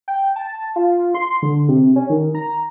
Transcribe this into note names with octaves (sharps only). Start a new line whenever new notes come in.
G5
A5
F4
C6
D3
C3
C#4
D#3
A#5